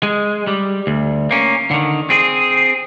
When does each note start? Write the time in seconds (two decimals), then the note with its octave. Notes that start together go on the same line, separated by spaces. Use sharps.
0.03 G#3
0.47 G3
0.87 D2
1.31 A#3 C#4
1.71 D3 D#3
2.10 C4 G#4